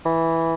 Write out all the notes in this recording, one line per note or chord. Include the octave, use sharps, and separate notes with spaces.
E3